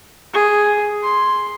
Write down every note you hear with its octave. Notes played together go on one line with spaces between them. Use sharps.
G#4
C6